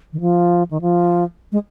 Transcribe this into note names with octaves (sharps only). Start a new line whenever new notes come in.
D#3
F3
D#3
F3
G#3